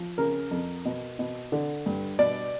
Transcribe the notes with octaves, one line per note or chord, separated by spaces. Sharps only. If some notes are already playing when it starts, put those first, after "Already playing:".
Already playing: F3
C#3 A#4
F2
B2
B2
D3
G2
B2 D5